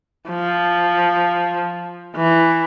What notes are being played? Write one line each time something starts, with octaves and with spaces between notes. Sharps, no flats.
F3
E3